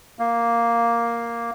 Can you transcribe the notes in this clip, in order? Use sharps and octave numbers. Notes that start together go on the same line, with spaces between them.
A#3